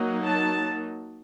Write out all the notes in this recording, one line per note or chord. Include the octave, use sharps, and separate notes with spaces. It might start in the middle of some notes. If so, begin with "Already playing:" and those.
Already playing: F#3 A#3 D#4
A5